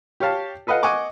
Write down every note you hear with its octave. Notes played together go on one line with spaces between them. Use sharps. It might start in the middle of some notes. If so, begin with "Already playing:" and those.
G4 C#5 F5 A5
A4 B4 D#5 F5 F#5
D#5 F#5 G#5 C#6 D6